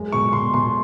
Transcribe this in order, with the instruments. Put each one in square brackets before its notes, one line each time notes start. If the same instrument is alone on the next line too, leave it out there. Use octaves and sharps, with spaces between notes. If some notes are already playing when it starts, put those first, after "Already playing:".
Already playing: [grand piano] F#2 G#3
B2 C#6
B2 C6
B2 C6